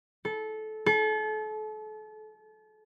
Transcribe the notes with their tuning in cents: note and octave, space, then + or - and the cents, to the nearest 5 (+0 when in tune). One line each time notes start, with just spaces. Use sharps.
A4 -20
A4 -35